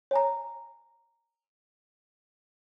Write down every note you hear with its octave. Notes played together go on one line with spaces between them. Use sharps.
C#5 G#5 A#5